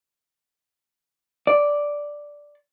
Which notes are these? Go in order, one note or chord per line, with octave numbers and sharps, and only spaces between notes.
D5